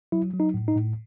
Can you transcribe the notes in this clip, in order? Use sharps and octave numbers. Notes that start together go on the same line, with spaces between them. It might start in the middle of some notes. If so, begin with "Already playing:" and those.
F#3 E4
F#3
D#4
A2
D#4
A2